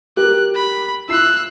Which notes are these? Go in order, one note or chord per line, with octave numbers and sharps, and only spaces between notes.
G4 A#4 F#6
B5
E4 F4 E6 F#6 C7